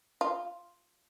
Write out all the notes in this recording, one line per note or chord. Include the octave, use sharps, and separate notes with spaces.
F4